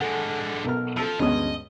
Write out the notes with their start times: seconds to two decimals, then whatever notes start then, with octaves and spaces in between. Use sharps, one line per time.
0.01 D3 G#3 A4 F#5
0.65 B1 A#4 F6
0.97 F3 A4 E6
1.20 D2 G2 B2 G#3 C#4 D#5 D#6